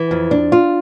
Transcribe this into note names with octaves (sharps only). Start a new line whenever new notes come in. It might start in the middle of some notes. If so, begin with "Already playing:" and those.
Already playing: E3
F2
D4
F4